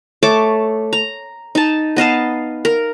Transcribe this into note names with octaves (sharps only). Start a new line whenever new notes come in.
A3 C#5 A5 D6
A#5
D#4 A5
B3 D#5 F5 A5
A#4